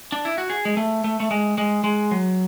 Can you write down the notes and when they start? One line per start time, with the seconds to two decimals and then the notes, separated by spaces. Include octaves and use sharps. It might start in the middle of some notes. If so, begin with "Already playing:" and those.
0.12 D4
0.25 E4
0.38 F#4
0.50 G#4
0.65 G#3
0.77 A3
1.04 A3
1.20 A3
1.31 G#3
1.58 G#3
1.84 G#3
2.11 F#3